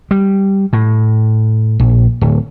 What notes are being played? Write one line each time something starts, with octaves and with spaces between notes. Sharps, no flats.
G3
A2
A#1
D1